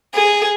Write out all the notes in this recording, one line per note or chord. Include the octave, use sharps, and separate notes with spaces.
G#4